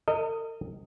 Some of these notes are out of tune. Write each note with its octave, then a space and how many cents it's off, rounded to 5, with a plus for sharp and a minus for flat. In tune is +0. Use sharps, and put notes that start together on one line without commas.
A#4 -45 D#5 +0